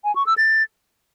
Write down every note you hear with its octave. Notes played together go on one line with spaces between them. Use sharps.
G#5
C#6
E6
A6